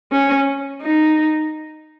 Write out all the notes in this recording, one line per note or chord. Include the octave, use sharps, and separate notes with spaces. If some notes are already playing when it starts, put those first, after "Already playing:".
C#4
D#4